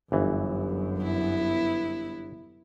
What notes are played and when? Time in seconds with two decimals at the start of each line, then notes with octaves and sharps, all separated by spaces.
0.12 G1 F#2 E3
1.01 B3 E4